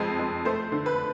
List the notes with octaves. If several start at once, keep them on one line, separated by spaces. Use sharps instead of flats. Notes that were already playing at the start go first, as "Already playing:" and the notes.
Already playing: F2 G#3
G#3
A3 C5
D3
B4